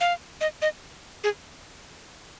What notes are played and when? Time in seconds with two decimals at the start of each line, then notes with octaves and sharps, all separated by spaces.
0.01 F5
0.41 D#5
0.62 D#5
1.24 G#4